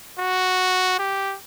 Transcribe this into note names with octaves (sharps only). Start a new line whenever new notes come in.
F#4
G4